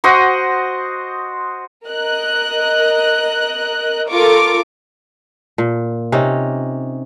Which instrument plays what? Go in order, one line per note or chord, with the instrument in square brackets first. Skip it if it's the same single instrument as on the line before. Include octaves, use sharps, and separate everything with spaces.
[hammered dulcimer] F#4 C5 D#5 F#5
[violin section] A#4 D#5 F#6
F4 A4 A#4 C#6 D6
[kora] A#2
C3 C#4 D#4